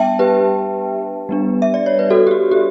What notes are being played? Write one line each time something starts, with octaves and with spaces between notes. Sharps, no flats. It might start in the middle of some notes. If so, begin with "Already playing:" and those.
Already playing: G3 B3 D4 E5 G5 A5
G4 B4
G3 B3 D4
E5
D5
C#5
B4
F#4 A4
G4
F#4
G4